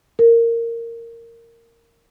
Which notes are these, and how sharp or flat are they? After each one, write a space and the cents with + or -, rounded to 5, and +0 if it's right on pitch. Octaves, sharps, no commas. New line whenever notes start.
A#4 -15